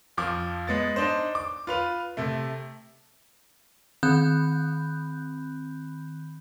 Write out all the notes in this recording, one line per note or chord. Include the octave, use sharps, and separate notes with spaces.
F2 F3 D6
G#3 B3 A6
D4 D#4 C5
D6
F4 B4 F7
C3 A3
D#3 C4 B5 F#6 G6